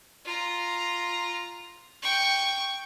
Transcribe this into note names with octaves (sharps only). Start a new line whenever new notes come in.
F4 A#5
G5 C#6